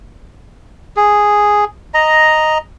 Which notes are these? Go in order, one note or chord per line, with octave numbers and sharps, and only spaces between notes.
G#4
D#5 A#5